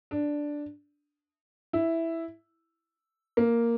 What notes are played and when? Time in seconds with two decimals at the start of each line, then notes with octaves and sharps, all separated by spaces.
0.11 D4
1.73 E4
3.37 A#3